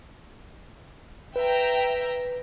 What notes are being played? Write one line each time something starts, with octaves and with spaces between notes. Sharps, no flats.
B4 E5 G5 A#5